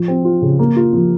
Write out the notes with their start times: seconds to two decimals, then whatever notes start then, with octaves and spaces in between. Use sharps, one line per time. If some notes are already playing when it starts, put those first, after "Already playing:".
Already playing: F3
0.08 C4
0.25 F4
0.42 C#3
0.59 A#3
0.76 F4
0.93 F3